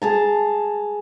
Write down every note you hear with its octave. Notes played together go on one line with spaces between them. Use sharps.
G#4 A5 A#5